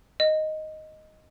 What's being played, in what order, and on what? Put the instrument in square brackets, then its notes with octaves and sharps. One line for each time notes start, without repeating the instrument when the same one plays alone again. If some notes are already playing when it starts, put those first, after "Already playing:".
[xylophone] D#5